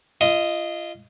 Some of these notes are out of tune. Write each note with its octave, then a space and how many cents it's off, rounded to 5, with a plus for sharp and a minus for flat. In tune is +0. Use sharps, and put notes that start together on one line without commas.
F4 -30 D#5 +0